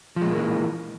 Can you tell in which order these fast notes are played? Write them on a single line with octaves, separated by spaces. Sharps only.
F3 G#3 A#2 A#3 E3